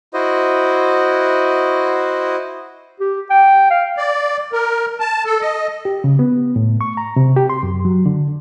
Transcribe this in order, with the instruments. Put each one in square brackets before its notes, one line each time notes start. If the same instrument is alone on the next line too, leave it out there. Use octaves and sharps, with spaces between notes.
[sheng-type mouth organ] E4 F#4 C5 D#5
[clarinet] G4
G5
F5
[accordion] D5
A#4
A5
A4
D#5
[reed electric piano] G4
C#3
B3
A2
C#6
A#5
C3
G4
C6
F#2
F#3
D3